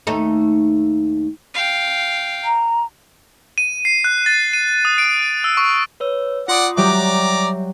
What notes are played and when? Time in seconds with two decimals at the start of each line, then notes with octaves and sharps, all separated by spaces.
0.07 D#2 A3 D#4
1.54 F5 G5
2.44 A#5
3.58 D#7
3.85 C7
4.04 F#6
4.26 A6
4.53 D#7
4.85 D#6
4.98 D7
5.44 E6
5.57 C#6
6.00 B4 C#5 E6
6.48 F4 D5 F#5 C6 D#6
6.77 F#3 G3 G4 D5 E5 A#5 D6